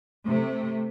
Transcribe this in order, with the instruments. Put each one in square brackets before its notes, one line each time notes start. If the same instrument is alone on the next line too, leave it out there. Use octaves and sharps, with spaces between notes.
[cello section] C3 A3